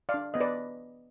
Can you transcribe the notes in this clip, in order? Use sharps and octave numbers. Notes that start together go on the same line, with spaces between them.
D5 F5
D4
B3 D#5
B4 D5